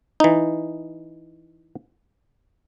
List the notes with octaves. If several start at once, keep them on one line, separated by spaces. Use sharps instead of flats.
E3 D#4